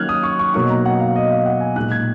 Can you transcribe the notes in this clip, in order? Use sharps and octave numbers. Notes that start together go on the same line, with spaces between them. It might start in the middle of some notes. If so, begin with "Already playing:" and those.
Already playing: D#3 F#3 A#3 C#4 F6 F#6 G#6
D#6
C#6
C#6
B2 F#3 A#3 D#4 C#6
A#5
F#5
F5
D#5
F5
F#5
G#5
A#2 G#3 D#4 F#6
G#6